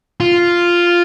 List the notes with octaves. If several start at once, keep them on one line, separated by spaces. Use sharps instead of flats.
F4